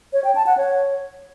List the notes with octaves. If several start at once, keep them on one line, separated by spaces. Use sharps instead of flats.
C#5
G5
A5
F#5
C#5